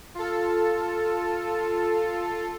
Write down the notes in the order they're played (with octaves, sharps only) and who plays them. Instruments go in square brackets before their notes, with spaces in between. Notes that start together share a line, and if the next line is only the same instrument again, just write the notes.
[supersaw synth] F4 A4